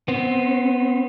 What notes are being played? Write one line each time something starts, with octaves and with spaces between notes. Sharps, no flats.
B3 C4